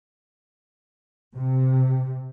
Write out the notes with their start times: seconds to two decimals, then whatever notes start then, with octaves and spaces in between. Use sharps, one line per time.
1.36 C3